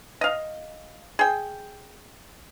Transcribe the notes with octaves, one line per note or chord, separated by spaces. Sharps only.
D#5 F5
G#4 G5